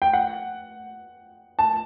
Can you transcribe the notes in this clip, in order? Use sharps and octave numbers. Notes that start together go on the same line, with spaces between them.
G5
F#5
A5